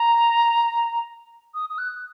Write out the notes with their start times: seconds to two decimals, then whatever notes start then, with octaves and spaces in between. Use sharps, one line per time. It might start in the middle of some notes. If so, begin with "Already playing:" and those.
Already playing: A#5
1.54 D#6
1.70 D#6
1.78 F#6